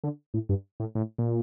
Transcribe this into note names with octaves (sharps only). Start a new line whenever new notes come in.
D3
A2
G2
A2
A2
A#2